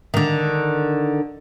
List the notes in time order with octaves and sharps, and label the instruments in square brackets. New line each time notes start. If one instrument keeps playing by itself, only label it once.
[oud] D3 D#3